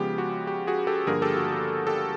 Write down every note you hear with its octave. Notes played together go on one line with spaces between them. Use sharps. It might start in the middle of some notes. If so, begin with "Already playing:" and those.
Already playing: C#3 F3 G#3 B3 G4
F#4
G4
F#4 G#4
G4 A4
G2 D3 F3 A#3 G#4 A#4
G4 A4
F#4
G4
G4 A4